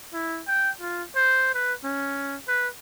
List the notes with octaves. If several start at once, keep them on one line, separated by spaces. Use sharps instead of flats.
E4
G5
F4
C5
B4
C#4
B4